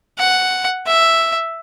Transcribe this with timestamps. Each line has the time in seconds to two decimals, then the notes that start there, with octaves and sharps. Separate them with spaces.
0.19 F#5
0.87 E5